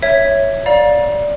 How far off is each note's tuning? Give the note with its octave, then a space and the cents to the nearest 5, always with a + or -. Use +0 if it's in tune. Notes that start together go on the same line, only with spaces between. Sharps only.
C#5 +0 E5 +0
D5 +0 F5 +30 A#5 +35